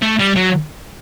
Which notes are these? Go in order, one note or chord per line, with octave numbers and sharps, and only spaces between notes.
A3
G3
F#3